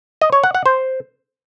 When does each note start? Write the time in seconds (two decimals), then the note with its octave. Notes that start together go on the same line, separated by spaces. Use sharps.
0.21 D#5
0.32 C#5
0.44 F#5
0.55 F#5
0.66 C5